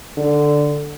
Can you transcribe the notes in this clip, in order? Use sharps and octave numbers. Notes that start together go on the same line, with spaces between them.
D3